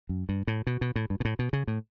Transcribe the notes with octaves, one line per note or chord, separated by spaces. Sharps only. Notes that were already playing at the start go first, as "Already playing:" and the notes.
F#2
G2
A2
B2
B2
A2
G2
B2
A2
B2
C#3
A2